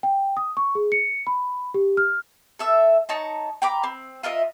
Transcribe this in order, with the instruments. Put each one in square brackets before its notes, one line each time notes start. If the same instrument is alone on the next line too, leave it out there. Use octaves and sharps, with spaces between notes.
[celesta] G5
D#6
C#6
G#4
C#7
B5
G4
F6
[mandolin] A4 E5 E6
D#4 C#5 A5 A#5
G5 A#5 B5 D6
C4
F4 A#4 D#5 E5